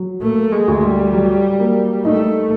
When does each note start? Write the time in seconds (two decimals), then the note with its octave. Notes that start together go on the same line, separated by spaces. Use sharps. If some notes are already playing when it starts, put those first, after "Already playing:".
Already playing: F#3
0.22 A3 A#3
0.52 G#3
0.68 D2
0.83 G3
1.13 F#3
1.59 A#3
2.05 A3 D#4